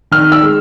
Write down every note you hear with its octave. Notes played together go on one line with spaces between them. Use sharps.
D#3 F6
E6
G#3